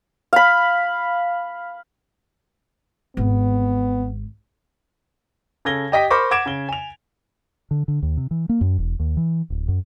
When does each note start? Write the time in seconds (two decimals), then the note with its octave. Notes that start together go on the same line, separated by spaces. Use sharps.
0.33 F5 B5
3.17 G#1 B3 C4
5.65 C#3 A4 G#6 A#6 G7
5.92 G4 D#5 G5 B6
6.10 A#4 C5 B5 C#6 D6 A#6
6.31 F#5 D6 G#6 A6 D7 E7
6.46 C#3 G7
6.69 G#5 F7
7.71 D3
7.88 D3
8.02 D#2
8.17 C3
8.31 E3
8.49 A#3
8.61 F#2
8.78 E1
8.99 D#2
9.17 E3
9.50 D1
9.68 F#2